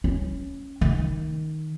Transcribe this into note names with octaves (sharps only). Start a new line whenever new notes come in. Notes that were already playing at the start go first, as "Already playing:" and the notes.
C#4
D#3